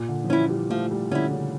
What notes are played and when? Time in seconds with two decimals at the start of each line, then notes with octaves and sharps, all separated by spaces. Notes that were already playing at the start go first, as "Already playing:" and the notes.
Already playing: A#2
0.09 D3
0.24 F3
0.30 E3 C#4 E4
0.50 G3
0.70 F3 A3
0.91 G3
1.11 D3 C#4 E4
1.31 C#3